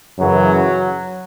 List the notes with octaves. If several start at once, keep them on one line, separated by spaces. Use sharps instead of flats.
F#2 C#3 E3 F#3